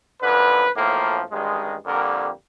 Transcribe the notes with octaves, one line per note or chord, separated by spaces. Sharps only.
F#2 D3 F3 B4
B1 A2 F3 A#3
A1 G2 D#3 G#3
F2 D3 G3 A#3 A#4